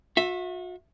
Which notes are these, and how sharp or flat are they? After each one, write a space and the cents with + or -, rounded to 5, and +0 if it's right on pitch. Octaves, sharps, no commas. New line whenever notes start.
F#4 -40 E5 +0